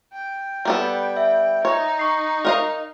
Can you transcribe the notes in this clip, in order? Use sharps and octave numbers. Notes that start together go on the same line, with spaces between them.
G5
G3 B3 A4
E5
D#4 C#5
C#6 C7
A#4 D#5 F5